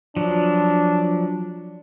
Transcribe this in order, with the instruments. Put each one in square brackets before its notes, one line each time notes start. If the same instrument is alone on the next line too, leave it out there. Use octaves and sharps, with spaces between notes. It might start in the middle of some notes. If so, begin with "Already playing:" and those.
[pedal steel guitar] F3 F#3 [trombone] D4